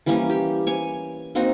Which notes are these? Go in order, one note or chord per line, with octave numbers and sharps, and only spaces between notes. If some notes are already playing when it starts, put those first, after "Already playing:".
E3 G3 A#3 C#4
G4
C#5 G#5
A#3 C4 D#4 F#4